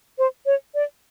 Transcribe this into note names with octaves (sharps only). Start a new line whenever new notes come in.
C5
C#5
D5